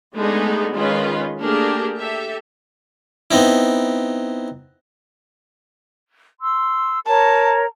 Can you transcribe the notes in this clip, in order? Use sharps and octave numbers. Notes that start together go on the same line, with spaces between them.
G#3 A3 B3 D4 D#4 G#4
D#3 G#3 C#4 F4 G#4 B4
A3 A#3 D4 G4 G#4 A#4
G4 A4 E5
B3 C4 D#4 E4
C6 E6
A#4 C#5 A5 A#5